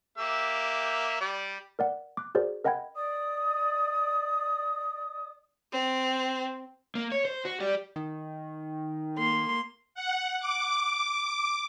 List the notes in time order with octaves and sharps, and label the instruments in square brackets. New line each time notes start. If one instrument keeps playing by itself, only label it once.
[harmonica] A#3 G4 E5
G3 D5
[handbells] A#4 D5 F#5
D6 F#6
F#4 G#4 A#4 C5 D5
A#4 D#5 F#5 G5 B5 G#6
[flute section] D5 D#5 D#6
[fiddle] C4
[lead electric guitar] A#3
C#5
C5
F#4
G4 D5
[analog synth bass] D#3
[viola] A#3 C6
[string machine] F#5
D6